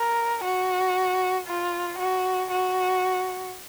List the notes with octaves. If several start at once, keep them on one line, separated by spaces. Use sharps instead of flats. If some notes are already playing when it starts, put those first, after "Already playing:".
Already playing: A#4
F#4
F4
F#4
F#4